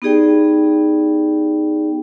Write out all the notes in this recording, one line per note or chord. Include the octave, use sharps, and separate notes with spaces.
B3 D#4 G4 G#4 D5 G5